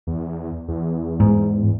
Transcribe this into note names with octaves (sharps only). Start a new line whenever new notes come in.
E2
E2
G#2